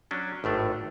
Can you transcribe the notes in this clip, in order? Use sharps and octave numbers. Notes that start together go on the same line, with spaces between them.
F#3 C#4 D4
G#1 A2 A3 D4